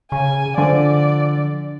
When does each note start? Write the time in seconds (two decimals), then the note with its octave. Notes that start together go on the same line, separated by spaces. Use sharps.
0.12 C#3 G#5
0.58 D3 F3 D5